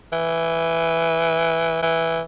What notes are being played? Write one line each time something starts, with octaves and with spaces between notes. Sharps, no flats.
E3
E3